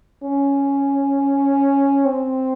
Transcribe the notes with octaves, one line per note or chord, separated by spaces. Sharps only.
C#4
C4